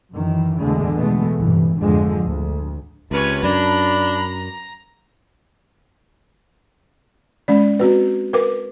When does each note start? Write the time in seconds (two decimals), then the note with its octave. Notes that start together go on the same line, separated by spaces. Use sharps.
0.13 F#2 D#3 E3
0.60 E2 B2 D3 G#3 A3
0.97 B2 E3 G#3 A3 B3
1.38 C2 G2 A#2 E3
1.79 G#1 F2 D3 F3 G#3
2.26 D2
3.11 C#2 C3 C#4 B4 C#5
3.43 F#2 D4 A#5 B5
7.48 G#3 C#4 D5
7.79 C4 F#4 B4
8.33 A#4 B4 D6